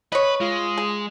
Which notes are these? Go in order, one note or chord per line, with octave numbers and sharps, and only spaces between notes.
B4 C#5 D#5
G#3 F4
G#4